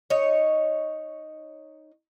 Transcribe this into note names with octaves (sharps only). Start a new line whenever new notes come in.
D#4 C#5